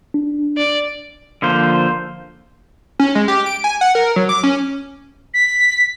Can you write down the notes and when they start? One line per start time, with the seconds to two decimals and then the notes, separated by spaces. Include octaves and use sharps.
0.14 D4
0.58 D5
1.42 D3 F3 A#3 C5
3.00 C#4
3.15 G#3
3.28 G4
3.46 D7
3.64 G#5
3.81 F#5
3.95 A#4
4.16 F#3
4.29 D6
4.43 C#4
5.34 B6